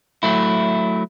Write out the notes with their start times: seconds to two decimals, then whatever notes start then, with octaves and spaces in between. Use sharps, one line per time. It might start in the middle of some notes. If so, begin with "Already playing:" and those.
0.23 F#3 A3 E4